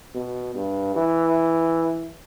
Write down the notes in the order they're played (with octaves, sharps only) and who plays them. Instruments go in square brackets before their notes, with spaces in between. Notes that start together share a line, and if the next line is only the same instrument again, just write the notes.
[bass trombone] B2
G2
E3